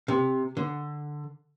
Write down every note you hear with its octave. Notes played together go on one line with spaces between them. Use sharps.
C3
D3